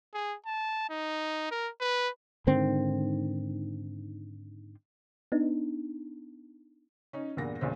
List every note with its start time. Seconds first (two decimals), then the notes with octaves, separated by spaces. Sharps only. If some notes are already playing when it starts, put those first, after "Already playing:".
0.14 G#4
0.46 A5
0.89 D#4
1.51 A#4
1.80 B4
2.47 G#2 D3 D#3 C4
5.32 B3 D4 D#4
7.13 C#4 D#4
7.37 E2 G2 A#2 A#3 F#5 A#6
7.61 D#1 A#1 E2 A#2 C5